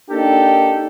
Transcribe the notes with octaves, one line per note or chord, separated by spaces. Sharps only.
A#3 D4 D#4 G4 A4 G5